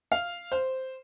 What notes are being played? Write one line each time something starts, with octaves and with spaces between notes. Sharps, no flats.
F5
C5